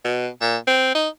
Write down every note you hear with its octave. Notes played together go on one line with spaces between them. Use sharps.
B2
A#2
C4
D#4